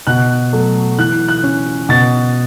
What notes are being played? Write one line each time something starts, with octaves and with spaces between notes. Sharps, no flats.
B2 F#6
F#3 A3
E3 F#6
F#6
C#4
B2 A6